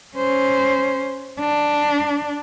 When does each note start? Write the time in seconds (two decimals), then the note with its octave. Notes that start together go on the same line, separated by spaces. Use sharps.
0.17 C#4 C5
1.40 D4